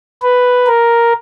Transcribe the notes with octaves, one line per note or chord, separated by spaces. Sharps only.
B4
A#4